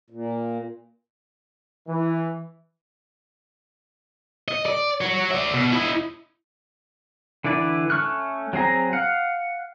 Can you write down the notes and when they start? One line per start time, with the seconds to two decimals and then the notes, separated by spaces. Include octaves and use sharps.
0.10 A#2
1.88 E3
4.48 D#5
4.66 D5
5.01 F#4 C#5
5.31 D5 E5
5.54 B2
5.72 E4 D#5
7.44 D3 E3 E4 B4 D5
7.90 A3 C#4 C#6 F6 F#6
8.53 F#3 C4 G#4 A#5
8.93 F5 F#5